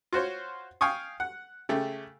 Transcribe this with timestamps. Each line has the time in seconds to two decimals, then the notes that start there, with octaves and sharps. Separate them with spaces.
0.13 F4 F#4 C5 C#5
0.81 F5 G5 G#5 C#6 D#6
1.20 F#5
1.69 C#3 A3 G4